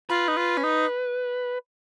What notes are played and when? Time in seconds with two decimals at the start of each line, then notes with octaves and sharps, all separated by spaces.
0.09 F4 B4
0.28 D#4
0.37 F4
0.57 C#4
0.64 D#4